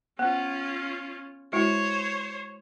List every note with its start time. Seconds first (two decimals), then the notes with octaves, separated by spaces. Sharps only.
0.19 B3 C#4 F4
1.53 G#3 E4 F#4 C5 C#5